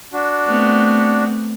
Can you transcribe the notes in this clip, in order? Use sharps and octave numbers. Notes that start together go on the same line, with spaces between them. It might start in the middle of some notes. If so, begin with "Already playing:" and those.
D4 F#4
A3 B3 C4